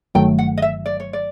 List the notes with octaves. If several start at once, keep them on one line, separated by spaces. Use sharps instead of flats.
G1 G2 D#3 F#3 A3 G5
F#5
D#5
E5
D5
C#5
D5